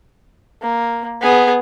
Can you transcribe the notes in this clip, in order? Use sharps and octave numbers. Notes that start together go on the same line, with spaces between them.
A#3
B3 G#4